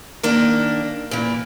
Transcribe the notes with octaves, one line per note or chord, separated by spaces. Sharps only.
D#3 A#3 D4
A#2 E3